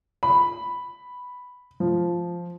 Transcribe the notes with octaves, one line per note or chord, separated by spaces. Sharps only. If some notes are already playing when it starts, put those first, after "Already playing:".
B5
F3